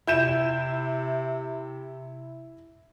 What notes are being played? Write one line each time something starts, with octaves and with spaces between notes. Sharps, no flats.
C3 E4 G6 E7